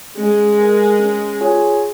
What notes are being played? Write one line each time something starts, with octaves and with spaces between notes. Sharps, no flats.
G#3 C#4
A#4 D#5 G#5
C#4
F4 G#4 C#5 G#5